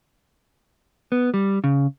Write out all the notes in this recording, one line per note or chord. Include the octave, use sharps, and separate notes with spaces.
B3
G3
C#3